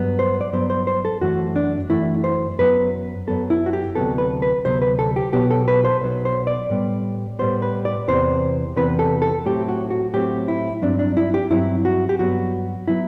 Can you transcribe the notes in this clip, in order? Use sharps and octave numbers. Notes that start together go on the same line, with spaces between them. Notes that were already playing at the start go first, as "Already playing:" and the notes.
Already playing: G2 F#3 B3
C5
D5
G2 F#3 B3 C5
C5
C5
A4
F#2 E3 A3 F#4
D4
F#2 E3 A3 E4
C5
F#2 F#3 B3 B4
F#2 F#3 B3 A4
E4
F#4
G4
D2 C3 F#3 B3 A4
B4
B4
D2 C3 F#3 B3 C5
B4
A4
G4
B1 B2 F#3 B3 G4
A4
B4
C5
B1 B2 F#3 B3
C5
D5
A2 G3 B3
A2 G3 B3 C5
B4
D5
E2 C3 E3 B3 C5
E2 C3 E3 B3 B4
A4
A4
A2 F#3 A3 C4 G4
F#4
F#4
A2 F#3 A3 C4 G4
E4
G2 F#3 C4 D4
D4
E4
G4
G2 F#3 C4 E4
F#4
G4
G2 F#3 B3 F#4
F#3 B3 E4